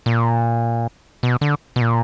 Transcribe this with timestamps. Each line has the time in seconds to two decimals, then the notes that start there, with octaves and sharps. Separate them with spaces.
0.06 A#2
1.23 B2
1.41 D3
1.76 B2
1.81 A#2